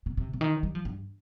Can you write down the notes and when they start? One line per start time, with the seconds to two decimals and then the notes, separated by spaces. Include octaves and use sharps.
0.06 C3
0.17 C3
0.33 C3
0.41 D#3
0.63 G3
0.75 F3
0.85 G2